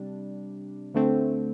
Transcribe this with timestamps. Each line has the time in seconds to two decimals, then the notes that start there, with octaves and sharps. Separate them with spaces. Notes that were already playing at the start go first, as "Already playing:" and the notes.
Already playing: C3 G3 D4
0.94 D2 D3 A3 C4